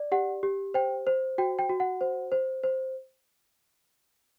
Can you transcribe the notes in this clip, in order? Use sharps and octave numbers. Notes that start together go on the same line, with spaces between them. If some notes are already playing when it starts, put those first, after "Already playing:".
Already playing: D5
G4 F#5
G4
C5 G5
C5
F#4 G5
G5
F#4
F#5
C5
C5
C5